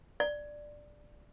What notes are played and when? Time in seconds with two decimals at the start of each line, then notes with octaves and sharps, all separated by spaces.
0.20 D5